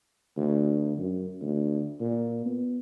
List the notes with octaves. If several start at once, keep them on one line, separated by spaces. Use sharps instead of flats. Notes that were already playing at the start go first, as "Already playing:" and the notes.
D2
F#2
D2
A#2
B3